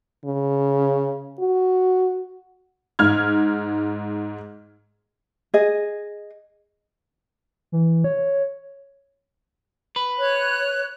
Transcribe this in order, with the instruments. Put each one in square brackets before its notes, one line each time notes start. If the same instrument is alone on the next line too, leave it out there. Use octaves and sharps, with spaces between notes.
[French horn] C#3
F#4
[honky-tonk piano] G#2 F6 G#6
[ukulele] G#4 D#5
[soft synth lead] E3
C#5
[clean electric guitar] B4
[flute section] C#5 F#6